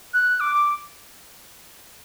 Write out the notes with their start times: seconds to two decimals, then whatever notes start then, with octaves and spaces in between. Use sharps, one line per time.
0.14 F#6
0.40 D6